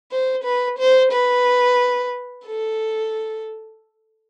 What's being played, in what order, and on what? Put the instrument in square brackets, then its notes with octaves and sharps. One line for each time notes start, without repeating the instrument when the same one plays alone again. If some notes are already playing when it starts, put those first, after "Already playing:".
[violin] C5
B4
C5
B4
A4